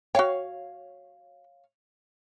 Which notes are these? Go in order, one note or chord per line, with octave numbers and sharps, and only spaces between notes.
F#4 C#5 F5 G5